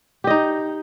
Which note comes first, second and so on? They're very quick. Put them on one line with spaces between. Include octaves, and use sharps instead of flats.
G4 D#5 D#4